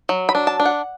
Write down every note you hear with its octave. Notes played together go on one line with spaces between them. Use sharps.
F#3
B5
D4
A5
D4
F#5